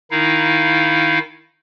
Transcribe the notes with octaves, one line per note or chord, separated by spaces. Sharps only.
D#3 D#4 E4 F5